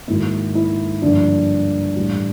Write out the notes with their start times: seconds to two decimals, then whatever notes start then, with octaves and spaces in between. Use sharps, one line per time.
0.08 G#2 D#3 F#3 A#3 E4
0.55 E4
1.02 G2 D3 F3 A#3 D4
1.96 A2 E3 G3